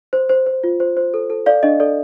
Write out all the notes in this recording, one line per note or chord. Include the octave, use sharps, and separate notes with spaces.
C5
C5
C5
F4
C5
C5
A4
A4
A4 D5 F5
D4 D#5
A4 D5